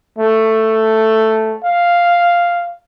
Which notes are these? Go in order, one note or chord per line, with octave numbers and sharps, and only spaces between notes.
A3
F5